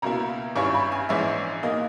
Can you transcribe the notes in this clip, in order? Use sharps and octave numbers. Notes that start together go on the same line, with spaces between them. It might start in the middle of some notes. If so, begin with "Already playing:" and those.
C#2 B2 A#3 E4 A#5
G#1 G2 G3 C#4 E4 C#6
B5
G#5
A#1 G#2 E3 G#3 C#4 E5
A#2 A#3 D#4 D#5